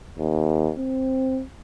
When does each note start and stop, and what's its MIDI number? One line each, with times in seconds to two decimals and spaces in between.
0.18 0.71 39
0.78 1.42 60